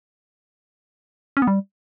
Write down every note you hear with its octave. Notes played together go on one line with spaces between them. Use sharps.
C#4
B3
G3